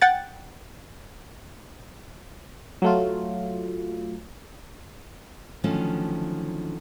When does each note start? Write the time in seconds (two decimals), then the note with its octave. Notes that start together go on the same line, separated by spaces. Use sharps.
0.02 F#5 G5 A6
2.82 F#3 A3 F4
5.64 D3 D#3 F3 F#3 A3 C#4